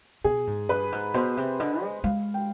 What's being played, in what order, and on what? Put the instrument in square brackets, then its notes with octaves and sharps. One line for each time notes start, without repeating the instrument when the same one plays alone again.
[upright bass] B2 [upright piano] G#4
[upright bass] G#2
[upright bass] G2 [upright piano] B4
[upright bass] G#2
[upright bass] B2 [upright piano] C5
[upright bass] C3
[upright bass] D3 [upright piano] D#5
[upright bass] G#3
[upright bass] G#3 [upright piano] F5
[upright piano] G5